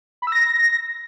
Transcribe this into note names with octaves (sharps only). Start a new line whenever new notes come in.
B5
E6
A#6